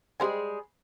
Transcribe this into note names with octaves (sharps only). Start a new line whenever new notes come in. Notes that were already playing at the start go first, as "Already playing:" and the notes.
G3 G#3 G4 G#4 C5 G#5